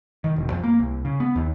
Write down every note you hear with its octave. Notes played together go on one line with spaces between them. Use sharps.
D#3
E1
F2
A#3
C2
C#3
B3
D#2